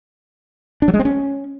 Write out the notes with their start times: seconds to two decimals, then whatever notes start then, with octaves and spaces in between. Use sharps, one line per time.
0.82 D4
0.88 F#3
0.94 G#3
0.99 C4
1.05 C#4